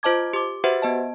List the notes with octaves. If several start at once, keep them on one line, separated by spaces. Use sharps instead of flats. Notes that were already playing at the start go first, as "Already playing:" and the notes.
F4 C5 D#5 A5 D6 G#6
G4 D6
F#4 G4 B4 C5 E5 F#5
B3 D#5 A5